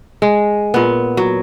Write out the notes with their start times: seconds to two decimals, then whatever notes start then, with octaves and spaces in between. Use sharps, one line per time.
0.22 G#3
0.74 A#2 B3
1.17 F#3